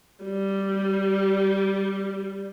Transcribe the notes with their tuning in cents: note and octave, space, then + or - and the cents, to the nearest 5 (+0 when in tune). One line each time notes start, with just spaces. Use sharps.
G3 -5